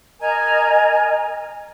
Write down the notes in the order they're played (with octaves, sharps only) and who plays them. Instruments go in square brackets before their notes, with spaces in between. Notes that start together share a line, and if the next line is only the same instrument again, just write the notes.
[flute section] A#4 D#5 G#5 A#5